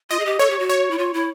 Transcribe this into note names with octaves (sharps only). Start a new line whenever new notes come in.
F4 D#5
G#4
G4
A4 C#5
G4
F#4
C#5
E4
F4
E4